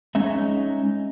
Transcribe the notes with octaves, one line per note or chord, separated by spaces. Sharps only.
G#3 C#4 D#4 E5